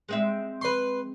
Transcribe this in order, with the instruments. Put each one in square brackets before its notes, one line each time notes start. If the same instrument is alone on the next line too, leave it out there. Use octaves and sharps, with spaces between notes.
[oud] G#3 C4 E5
[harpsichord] B4 C6